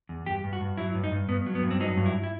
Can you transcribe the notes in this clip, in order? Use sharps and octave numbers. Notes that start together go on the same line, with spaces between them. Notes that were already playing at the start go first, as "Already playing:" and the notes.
E2
G2 G4
G2
F#4
G2
F#3 E4
G2
D#4
G2
G2 B3
F#3
B3
G2
C4
F#3 D#4
G2
E4
E4